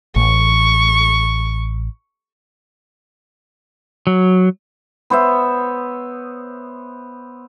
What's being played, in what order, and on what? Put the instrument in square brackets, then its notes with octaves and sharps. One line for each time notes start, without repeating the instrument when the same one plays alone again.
[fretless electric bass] A1 [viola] C#6
[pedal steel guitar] F#3
[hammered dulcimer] B3 C5 C#5 E5